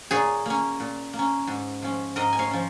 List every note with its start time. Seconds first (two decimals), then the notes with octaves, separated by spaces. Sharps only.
0.11 A#2 G#4 C#5
0.46 A#3 C#4
0.80 A#2
1.13 A#3
1.19 C#4
1.47 G#2
1.82 F3 C#4
2.16 G#2 A#4 D#5
2.33 G#5
2.39 C#5 F5
2.51 F3 C#4